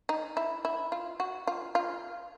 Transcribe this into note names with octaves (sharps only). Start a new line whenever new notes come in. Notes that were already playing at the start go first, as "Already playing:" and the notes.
D#4
E4
E4
F4
F#4
F4
F4